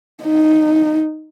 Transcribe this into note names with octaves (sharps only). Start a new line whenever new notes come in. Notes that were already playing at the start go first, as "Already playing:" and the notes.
D#4